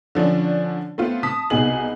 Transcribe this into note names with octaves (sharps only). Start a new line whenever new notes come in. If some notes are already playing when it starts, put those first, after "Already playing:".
D3 F3 C#4 D4
A3 B3 C4 F4
A5 D#6 B6
C2 B2 B3 D#4 G#4 F#7